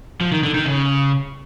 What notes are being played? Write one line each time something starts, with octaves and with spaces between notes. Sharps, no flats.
F3
D#3
D3
D#3
C#3